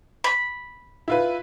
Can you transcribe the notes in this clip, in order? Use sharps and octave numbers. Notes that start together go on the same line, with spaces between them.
B5
E4 F4 B4